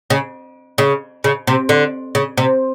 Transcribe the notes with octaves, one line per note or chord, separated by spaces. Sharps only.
C#3
C#3
C#3
C3
D3
C#3
C3